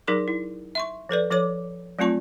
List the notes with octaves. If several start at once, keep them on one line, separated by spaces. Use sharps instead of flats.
F#3 D#4 G#4 A#4 C6 D6
E4
E5 C6 C#6
F3 A4 B4 D5
F3 A4 C#5 D6
F#3 A3 C4 F4 A5 C#6